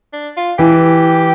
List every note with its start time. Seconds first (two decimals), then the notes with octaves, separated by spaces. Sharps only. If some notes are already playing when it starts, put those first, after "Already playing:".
0.13 D4
0.37 F4
0.59 E3 G4